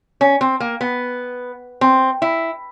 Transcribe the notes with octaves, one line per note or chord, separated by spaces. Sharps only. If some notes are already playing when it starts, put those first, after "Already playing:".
C#4
C4
A#3
B3
C4
E4